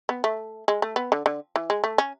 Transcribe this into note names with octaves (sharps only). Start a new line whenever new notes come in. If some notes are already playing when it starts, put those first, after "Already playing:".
B3
A3
G#3
A3
B3
D3
D3
E3
G#3
A3
C#4